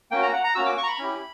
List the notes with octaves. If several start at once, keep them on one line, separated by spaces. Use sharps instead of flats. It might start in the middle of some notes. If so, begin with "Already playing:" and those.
A#3 C#4 F#4 G5
A#5
F#5
A#5
A#3 C#4 F#4 E6
D6
C#6
A#5
B5
C#4 E4 G4